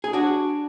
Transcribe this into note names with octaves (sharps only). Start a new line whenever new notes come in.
G#4
D4 F#4